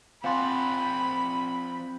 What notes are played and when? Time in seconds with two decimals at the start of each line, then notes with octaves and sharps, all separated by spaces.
0.24 F3 C4 D5 F5 F#5 G#5 B5 C6